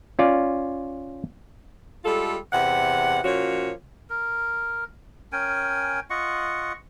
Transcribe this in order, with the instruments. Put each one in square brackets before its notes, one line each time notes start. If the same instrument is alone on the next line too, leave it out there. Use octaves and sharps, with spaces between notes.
[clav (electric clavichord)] C#4 F4 D5
[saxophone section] G3 G#3 F4 A4
E2 C3 F#5
A#2 F3 C#4 F#4 C#5
[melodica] A#4
C#4 A#4 G5 G#5
F4 D#5 F#5 C#6